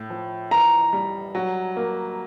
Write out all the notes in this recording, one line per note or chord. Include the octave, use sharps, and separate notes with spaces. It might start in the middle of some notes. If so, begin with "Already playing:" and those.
Already playing: A2
F3
E3 A#5
G3
F#3
A#3